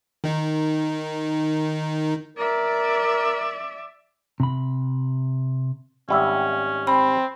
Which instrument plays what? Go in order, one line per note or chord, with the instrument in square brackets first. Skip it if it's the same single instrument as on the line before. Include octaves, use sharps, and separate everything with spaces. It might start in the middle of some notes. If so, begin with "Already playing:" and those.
[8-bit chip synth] D#3 D#4
[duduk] A#4 [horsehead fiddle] D5 E5
[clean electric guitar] C3 B5
[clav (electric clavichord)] G#1 G3 E5 [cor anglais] C#4
[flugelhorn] C4 [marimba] B5